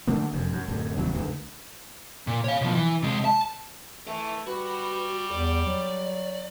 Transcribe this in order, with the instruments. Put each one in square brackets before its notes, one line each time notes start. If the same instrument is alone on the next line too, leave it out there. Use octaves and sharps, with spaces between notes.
[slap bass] D3 A3 A#3
F1 F#2
F#2
D1 F#2
G1 E2 C#3 F#3
C#2 D3 D#3
[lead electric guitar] A#2
C#5 F5
B2 F3
E3
C3 G#3
A5
[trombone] A3 [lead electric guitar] B4 E5
[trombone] G3 [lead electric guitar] F#4 [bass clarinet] B4
[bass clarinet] E2 [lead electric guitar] D5
[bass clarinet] F#3